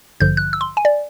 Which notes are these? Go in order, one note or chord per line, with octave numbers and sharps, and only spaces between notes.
A1 G2 D3 F3 G6
F#6
E6
C6
G#5
D5